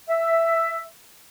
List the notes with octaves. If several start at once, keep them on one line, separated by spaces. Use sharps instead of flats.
E5